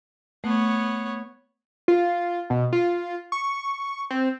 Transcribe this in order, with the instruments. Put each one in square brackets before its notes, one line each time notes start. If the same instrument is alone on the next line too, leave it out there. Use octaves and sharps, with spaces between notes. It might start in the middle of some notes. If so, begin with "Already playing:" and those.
[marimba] A3 [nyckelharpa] B3 C#5
[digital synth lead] F4
B2
F4
C#6
C4